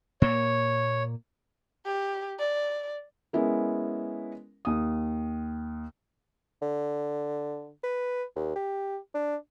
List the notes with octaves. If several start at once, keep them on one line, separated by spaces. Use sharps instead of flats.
A#2 A#3 C#5
G4
D5
G#3 B3 C#4 E4 A#4
D#2 D#6
D3
B4
D#2
G4
D4